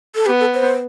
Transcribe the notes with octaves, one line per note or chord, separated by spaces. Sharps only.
A4
B3 G4
A4
C5